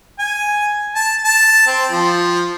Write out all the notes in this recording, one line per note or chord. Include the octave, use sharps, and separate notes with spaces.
G#5
A5
A5
C4
F3